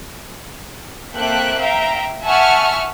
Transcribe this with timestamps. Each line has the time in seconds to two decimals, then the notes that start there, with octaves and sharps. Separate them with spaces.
1.14 A#3 C4 A4 E5 G5 F#6
1.59 E5 F5 G5 A#5
2.24 E5 F#5 G#5 A5 C#6 F6